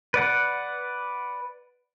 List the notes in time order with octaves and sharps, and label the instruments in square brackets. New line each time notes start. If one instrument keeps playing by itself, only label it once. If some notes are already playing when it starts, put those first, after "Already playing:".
[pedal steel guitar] B4 D5 F#5